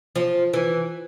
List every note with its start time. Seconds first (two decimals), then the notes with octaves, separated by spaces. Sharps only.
0.15 F3
0.53 E3